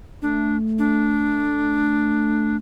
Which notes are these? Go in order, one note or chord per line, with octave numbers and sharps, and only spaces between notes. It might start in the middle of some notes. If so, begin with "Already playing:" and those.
A3 D4
D4